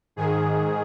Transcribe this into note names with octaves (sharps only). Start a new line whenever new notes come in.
G#2 D#3 G#4